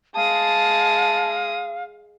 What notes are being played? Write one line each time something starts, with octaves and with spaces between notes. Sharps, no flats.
G#3 F5 A5 D#6